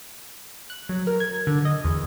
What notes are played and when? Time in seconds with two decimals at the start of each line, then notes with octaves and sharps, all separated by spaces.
0.70 F#6
0.89 F#3
1.07 A#4
1.20 G#6
1.47 D3
1.65 D#5
1.85 E2